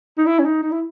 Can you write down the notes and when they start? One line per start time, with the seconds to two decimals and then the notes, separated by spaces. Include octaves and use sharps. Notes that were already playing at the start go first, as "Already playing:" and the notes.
0.18 D#4
0.26 E4
0.39 C#4
0.45 D#4
0.63 D#4
0.71 E4